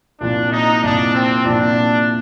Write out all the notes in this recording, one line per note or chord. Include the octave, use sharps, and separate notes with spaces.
C2 A#2 F3 D4
D#4
C2 A#2 F3 D4
C4
C2 A#2 F3 D4